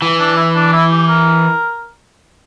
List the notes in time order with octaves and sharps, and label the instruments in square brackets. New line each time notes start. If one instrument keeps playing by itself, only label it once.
[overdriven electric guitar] E3
[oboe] D4
E4
D4
E4
G4
A#4